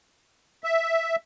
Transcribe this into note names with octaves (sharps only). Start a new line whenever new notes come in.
E5